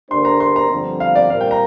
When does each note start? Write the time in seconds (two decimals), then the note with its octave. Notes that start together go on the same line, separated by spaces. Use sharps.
0.11 D3 A#3 D4 G4 C5 C6
0.25 A#5
0.40 C6
0.56 A#5
0.70 G2 D3 F3 C4
1.00 F5
1.15 D5
1.30 A#2 G3 C4 A#4 F5
1.41 G5
1.51 A#5